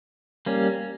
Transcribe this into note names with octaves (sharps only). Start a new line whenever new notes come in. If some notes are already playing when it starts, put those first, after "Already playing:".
G3 A#3 C#4